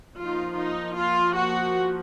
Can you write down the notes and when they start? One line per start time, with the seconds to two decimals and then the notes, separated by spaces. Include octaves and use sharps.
0.17 F3 A#3 D#4 F4
0.55 D#4
0.96 F4
1.35 F#4